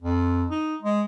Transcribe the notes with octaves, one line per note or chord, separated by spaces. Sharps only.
F2
D#4
G#3